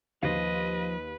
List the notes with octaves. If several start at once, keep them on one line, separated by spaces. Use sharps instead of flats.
D#2 F3 B4 C5 D#5 F5